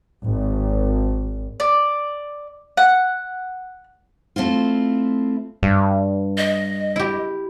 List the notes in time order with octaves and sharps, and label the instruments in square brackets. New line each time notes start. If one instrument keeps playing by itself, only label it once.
[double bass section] G#1
[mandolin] D5
F#5
[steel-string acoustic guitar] A3 C4 E4 F4
[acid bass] G2
[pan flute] D#5
[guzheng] E4 G4